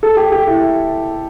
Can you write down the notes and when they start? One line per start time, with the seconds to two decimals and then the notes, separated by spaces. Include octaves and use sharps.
0.03 A4
0.17 G4
0.32 G4
0.47 E4